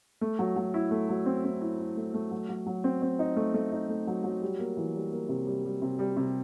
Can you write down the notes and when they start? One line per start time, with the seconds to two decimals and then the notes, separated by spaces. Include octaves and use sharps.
0.21 A3
0.39 F#3
0.56 F#3
0.74 E4
0.91 A3
1.09 F#3
1.26 C4
1.44 C4
1.61 E4
1.79 E4
1.97 A3
2.14 A3
2.31 F#3
2.49 F#3
2.67 F#3
2.84 C4
3.02 C4
3.19 D#4
3.36 A3
3.54 A3
3.72 D#4
3.89 A3
4.07 F#3
4.24 F#3
4.42 G3
4.59 A#3
4.77 E3
4.95 G3
5.12 A#3
5.29 C3
5.47 G3
5.65 G3
5.82 C3
5.99 G3
6.17 C3